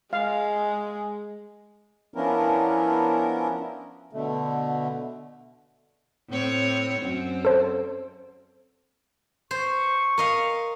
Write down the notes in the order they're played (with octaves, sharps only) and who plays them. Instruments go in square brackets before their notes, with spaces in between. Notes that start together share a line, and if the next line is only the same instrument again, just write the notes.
[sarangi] G#3 [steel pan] F5
[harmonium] F3 B3 C#4 D4 E4 A#4
B2 D3 A3
[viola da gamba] A2 C4 C#5
F#2 C4
[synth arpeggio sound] A4 C5
[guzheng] C5 [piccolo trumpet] C#6
[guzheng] A#4 D#5 F5